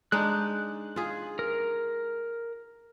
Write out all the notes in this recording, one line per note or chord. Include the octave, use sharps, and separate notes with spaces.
G#3 D4 D#4 F#6
F4 G#4
A#4